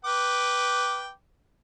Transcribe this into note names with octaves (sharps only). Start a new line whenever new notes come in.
B4 G5 D6